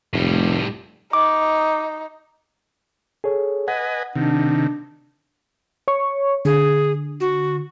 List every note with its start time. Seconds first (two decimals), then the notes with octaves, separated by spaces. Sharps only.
0.13 F1 A2 G3
1.13 D#4 D6
3.24 G#4 A4 C#5
3.68 B4 D#5 F#5 G#5
4.15 C3 D#3 D4
5.88 C#5 C#6
6.45 D3 G#4
7.20 F#4